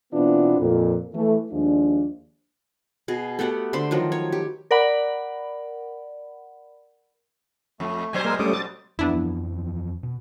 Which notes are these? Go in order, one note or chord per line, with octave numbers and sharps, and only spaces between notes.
B2 E3 B3 C4 D4 F4
F2 A#2
E3 A3
D#2 F3 G#3 D4
B2 G#4
A3 B3 G4 F#5
D3 C5 B5 C6
D#3 F3 F#3
C#5
G4
A#4 D5 F#5 B5
F2 A3
B2 F#3 C5 G#5
G#3 A#3 A#4 G#5
G3 A3 C#4 D6 D#6
A6
F2 E3 F3 B3 D4 E4
B2